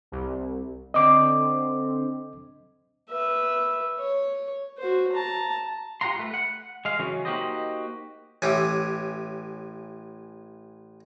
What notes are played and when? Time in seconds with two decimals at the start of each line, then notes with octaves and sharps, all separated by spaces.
0.12 C2
0.94 D3 C4 D#5 D6
3.10 B4 E5
3.99 C#5
4.78 F#4 C5
5.13 A5 A#5
6.01 F4 G4 F#5 A#5 C6
6.19 A3 B4
6.34 F#5
6.85 G#3 F5
6.99 C#3 E3 F#3 C#4
7.25 A#3 D#4 F#4 G4 C5 D#5
8.42 A1 E3 C#4 G4